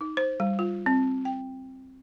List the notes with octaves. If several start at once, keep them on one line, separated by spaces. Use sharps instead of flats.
D#4
C5
G3
F4
C4
G5